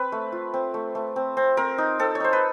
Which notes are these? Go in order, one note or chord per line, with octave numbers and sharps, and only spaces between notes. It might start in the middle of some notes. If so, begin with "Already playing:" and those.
Already playing: C4 B4
A3
F4
C4
A3
A3
C4
C4
C4 A#4
D#4
C4 A4
C#5
D#4 C5
B4